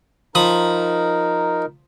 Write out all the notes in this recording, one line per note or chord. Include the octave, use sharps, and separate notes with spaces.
F3 D#4 A#4 B5 D#6